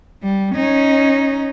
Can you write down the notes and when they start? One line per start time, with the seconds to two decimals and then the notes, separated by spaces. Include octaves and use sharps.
0.22 G3
0.55 C#4 D#4